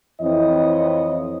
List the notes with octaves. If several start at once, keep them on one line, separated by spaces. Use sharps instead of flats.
F2 E3 C4 E4 C#5 D#5